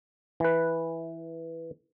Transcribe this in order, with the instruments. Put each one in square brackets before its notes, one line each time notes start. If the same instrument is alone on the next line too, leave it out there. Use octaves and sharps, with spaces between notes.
[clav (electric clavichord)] E3 B4